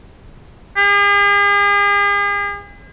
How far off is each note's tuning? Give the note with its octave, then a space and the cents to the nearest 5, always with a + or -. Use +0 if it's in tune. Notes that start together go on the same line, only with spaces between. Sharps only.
G#4 -45